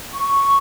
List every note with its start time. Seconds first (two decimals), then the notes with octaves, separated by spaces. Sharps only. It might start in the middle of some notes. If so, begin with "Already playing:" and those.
0.12 C#6